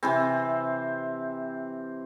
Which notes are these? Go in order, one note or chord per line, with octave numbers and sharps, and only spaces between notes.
C3 E3 C4